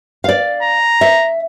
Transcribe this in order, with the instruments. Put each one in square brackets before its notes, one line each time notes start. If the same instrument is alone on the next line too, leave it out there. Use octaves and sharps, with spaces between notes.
[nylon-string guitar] D5 F5
[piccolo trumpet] A#5
[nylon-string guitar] E5